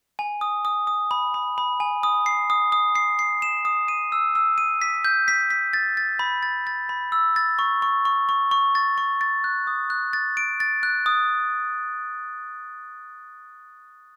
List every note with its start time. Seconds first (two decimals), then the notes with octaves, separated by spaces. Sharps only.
0.19 G#5
0.41 D#6
0.65 D#6
0.87 D#6
1.11 B5
1.34 B5
1.58 B5
1.80 G#5
2.03 D#6
2.26 C7
2.50 D#6
2.72 D#6
2.95 C7
3.19 C7
3.42 E7
3.65 D#6
3.88 D#7
4.12 E6
4.35 E6
4.58 D#7
4.81 B6
5.05 G6
5.28 B6
5.50 B6
5.73 A6
5.97 A6
6.19 B5
6.43 A6
6.67 A6
6.89 B5
7.12 E6
7.36 A6
7.59 C#6
7.82 C#6
8.05 C#6
8.29 C#6
8.51 C#6
8.75 A6
8.98 C#6
9.21 A6
9.44 F#6
9.67 D#6
9.90 F#6
10.13 A6
10.37 D7
10.60 A6
10.83 F#6
11.06 D#6